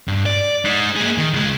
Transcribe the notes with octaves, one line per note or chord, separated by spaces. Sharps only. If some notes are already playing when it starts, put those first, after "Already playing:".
G2
D5
G#3 D#4
A#3 G#4
D#3
C#2 G#3